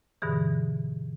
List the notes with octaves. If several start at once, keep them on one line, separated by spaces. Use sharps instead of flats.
G2 B2 D3 E3 G#4